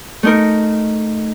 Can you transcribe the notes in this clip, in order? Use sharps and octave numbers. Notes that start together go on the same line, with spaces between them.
A3 D#4 A#4